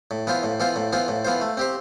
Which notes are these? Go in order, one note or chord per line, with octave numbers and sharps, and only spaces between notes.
A2
E3 B3 F4 C5
A2
E3 B3 F4 C5
A2
E3 B3 F4 C5
A2
E3 B3 F4 C5
A3
C4 G4 C5